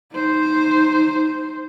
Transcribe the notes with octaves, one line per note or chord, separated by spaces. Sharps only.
D#4 C5